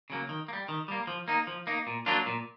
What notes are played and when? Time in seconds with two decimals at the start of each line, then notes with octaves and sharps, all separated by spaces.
0.10 C#3 F#3 A#3
0.29 D#3
0.48 A#3
0.53 G3
0.68 D#3
0.88 G3 A#3
1.07 F3
1.28 A#3 D#4
1.47 F3
1.67 A#3 D#4
1.87 A#2
2.06 F#3 A#3 D4 F4
2.26 A#2